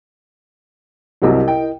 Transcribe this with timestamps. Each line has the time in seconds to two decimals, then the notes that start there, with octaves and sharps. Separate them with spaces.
1.22 C2 C3 F#3 E4 A#4 D#5
1.48 G5